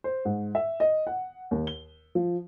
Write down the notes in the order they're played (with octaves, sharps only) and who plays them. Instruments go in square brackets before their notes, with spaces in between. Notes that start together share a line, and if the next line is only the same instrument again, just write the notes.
[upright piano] C5
G#2
E5
D#5
F#5
D#2
G7
F3